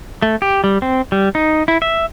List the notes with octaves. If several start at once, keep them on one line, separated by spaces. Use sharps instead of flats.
A3
G4
G3
C4
G3
D#4
E4
E5